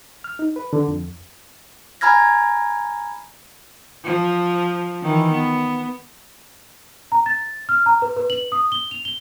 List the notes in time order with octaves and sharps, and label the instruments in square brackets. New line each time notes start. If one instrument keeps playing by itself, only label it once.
[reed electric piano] F6
D#4
B4
D3
F2
[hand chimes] G#5 A#5 B5 F6 G#6 A#6
[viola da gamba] F3
D#3 E3
B3
[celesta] A#5
A6
F6
A#5
B4
B4
F#7
D#6
G7
F7
G7